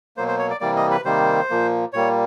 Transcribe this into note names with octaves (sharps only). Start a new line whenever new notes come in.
B2 F#3 A#3 C5
C5
C#5
D5
C3 E3 G3 A#3 D5
D#5
B4
C3 D#3 G3 A#3 C5
A#2 F3 A#3
A#2 G3 A#3 C#5